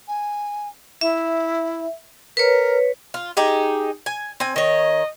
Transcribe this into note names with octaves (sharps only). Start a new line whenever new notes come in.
G#5
E4 E5
A#4 B4 C#5
F4
D#4 G4 G#4
G#5
C4 G#5
D#3 C#5 D#5